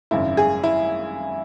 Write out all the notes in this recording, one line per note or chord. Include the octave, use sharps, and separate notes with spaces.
G#1 F#2 C#3 E4
G#4
E4